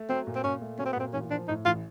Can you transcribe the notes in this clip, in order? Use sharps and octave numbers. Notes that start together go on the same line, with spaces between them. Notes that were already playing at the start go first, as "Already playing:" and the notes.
Already playing: A3
F#3 C4
A#2
C4
A#2 C#4
A3
F#3 C#4
C4
B3
A#2 C4
A1 C#4
F3 D4
A2 D#4
A1 F4